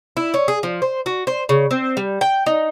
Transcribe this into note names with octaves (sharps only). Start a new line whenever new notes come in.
E4
C#4
G#4
F3
C5
F#4
C5
C#3
C4
G3
G5
D#4